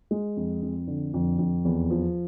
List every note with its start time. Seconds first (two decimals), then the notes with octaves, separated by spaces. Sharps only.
0.11 G#3
0.37 F2
0.62 F2
0.87 D3
1.14 F2
1.39 F2
1.65 E2
1.90 F3